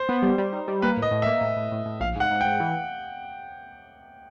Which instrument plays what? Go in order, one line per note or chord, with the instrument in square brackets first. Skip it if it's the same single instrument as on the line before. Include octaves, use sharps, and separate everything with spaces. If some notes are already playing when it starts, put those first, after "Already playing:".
Already playing: [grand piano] C5
[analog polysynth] B3
G3
G3
D#4
G3
[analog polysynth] A#3 [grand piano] B4
[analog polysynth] A2
[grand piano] D#5
[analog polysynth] A2
[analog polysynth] A#3 [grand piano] E5
[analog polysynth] A2
A2
A2
A2
[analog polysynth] A#1 [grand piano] F5
[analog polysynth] G#2 [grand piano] F#5
[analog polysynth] G#2
[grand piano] G5
[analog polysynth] G#2
E3